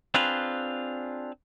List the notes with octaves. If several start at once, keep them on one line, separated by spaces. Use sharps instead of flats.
C4 D4 F4 G#4 B4